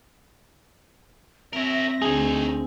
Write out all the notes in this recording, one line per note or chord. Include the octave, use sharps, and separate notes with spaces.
C4 A#4 C#5 E5 A#6
D2 D#4 G#4 C#5